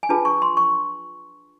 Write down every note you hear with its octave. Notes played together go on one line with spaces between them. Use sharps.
G#5
D4 F4 G#4 B4 A5
C#6
C6
C#6